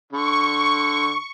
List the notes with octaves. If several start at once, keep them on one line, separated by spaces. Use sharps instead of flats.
D3 C#6